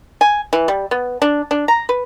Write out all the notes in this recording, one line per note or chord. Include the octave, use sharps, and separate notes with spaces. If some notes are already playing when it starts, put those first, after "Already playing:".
G#5
E3
G3
B3
D4
D4
A#5
B4